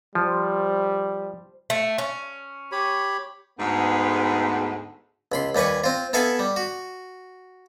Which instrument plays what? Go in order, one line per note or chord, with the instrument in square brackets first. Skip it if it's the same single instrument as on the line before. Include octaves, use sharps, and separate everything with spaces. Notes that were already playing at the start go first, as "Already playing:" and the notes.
[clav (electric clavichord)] F3 [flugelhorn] G3 [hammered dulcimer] C5
[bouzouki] A3
C#4
[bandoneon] G4 C#5 B5
[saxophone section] D2 G#2 [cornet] B3
[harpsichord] C#2 B5 C6
D#2 G3 B4 G#5 C#6
C4 F4
B3 E4 A4 F5 G#5 B5
G3
F#4